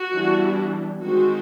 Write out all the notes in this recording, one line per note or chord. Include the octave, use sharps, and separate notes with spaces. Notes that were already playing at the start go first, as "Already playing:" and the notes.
Already playing: F#4
E3 G3 B3 D4
D#3 G#3 C4 F#4